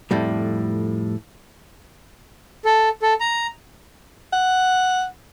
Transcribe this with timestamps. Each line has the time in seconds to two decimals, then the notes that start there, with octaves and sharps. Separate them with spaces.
0.11 F2 A2 G3
2.65 A4
3.02 A4
3.21 A#5
4.33 F#5